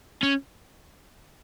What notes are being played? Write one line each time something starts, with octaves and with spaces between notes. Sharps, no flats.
C#4